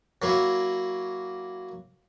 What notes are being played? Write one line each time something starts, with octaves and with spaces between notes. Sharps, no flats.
F#3 A#3 E4